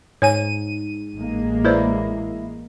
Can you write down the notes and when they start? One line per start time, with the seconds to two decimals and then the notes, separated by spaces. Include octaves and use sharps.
0.22 G#2 C#5 G#5 D#7
1.17 A1 G#3 A#3
1.65 E4 B4 C5 D5